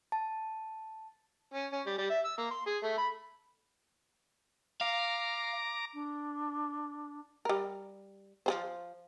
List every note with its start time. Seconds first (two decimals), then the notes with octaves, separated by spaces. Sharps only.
0.12 A5
1.54 C#4
1.72 C#4
1.86 G3
1.98 G3
2.10 E5
2.25 E6
2.38 A#3
2.51 C6
2.66 G#4
2.83 A3
2.98 B5
4.81 F5 A#5 D6
5.94 D4
7.45 G3 A#4
8.46 F3 G#4 C5